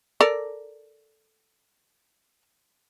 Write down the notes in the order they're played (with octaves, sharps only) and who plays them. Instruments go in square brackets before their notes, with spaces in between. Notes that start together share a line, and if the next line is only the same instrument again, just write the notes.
[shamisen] A4 A#4 D5